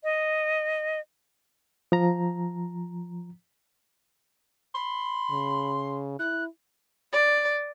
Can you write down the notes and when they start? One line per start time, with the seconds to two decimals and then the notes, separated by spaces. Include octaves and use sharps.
0.04 D#5
1.92 F3 A#5
4.75 B5 C6
5.31 C#3
6.19 E4 F#6
7.13 D5